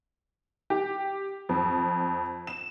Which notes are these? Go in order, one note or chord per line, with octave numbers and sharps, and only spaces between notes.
G4
F2
E7